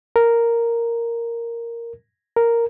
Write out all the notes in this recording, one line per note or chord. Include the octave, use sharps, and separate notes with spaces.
A#4
A#4